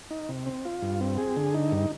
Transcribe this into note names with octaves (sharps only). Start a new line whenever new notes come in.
D#4
C3
C4
F4
G2
C4
G#4
D3
D#4
G2